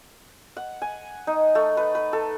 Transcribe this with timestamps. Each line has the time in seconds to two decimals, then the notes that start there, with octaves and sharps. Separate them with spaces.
0.57 F#5
0.82 G#5
1.27 D#4
1.55 A3
1.77 B4
1.95 B4
2.13 A4